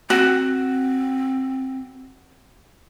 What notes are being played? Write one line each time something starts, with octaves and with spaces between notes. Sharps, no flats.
C4 F#4